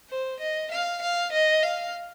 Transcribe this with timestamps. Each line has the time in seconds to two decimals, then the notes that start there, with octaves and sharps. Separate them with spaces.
0.09 C5
0.40 D#5
0.71 F5
1.01 F5
1.32 D#5
1.63 F5